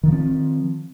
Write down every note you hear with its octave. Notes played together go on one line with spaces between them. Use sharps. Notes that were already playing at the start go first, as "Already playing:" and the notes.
D#3 F3 C4